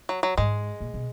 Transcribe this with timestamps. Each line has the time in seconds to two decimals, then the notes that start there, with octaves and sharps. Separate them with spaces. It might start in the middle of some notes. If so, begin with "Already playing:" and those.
0.09 F#3
0.23 F#3
0.37 G#2 G#3
0.80 A#2
0.94 B2